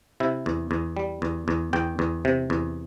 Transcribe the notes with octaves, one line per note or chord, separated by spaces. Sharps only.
C3 E4
E2
E2
G3
E2
E2
E2 G5
E2
C3
E2